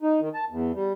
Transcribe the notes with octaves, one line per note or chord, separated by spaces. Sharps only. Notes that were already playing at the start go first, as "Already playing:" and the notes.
D#4
D#3
A5
E2
G3